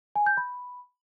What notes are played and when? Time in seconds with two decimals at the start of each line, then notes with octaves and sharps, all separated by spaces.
0.16 G#5
0.26 G6
0.37 B5